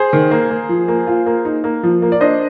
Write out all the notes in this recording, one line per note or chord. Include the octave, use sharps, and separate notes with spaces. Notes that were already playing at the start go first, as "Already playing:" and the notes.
Already playing: G#4 C5
D#3
A#3
A#3
F3
A#3
F4
A#3
D#4
A#3
F3
A#3
D5
D4 C5 D#5